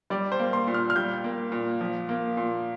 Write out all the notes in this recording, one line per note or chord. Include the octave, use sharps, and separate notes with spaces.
G3 D5
C5
A#3
C6
A#2
F6
F6
G3 G6
A#3
A#2
F3
A#3
A#2